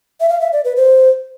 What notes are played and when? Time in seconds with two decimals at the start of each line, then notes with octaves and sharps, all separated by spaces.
0.20 E5
0.29 F5
0.41 E5
0.53 D5
0.65 B4
0.76 C5